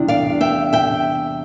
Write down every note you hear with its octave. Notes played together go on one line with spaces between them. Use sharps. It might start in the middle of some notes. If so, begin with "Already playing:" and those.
Already playing: E2 C3 G3 D4
D5 F5
E5 G5
E5 G5